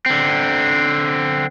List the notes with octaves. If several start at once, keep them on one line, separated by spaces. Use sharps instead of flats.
D3 C4